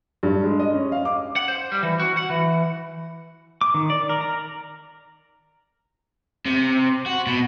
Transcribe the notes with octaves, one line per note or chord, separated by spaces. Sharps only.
G2
G#3
D#5
C#4
F5
D6
F#5
C5
G3
E3
F#4
F#5
E3
D6
D#3
D5
A#4
A#5
C3
F#4
B2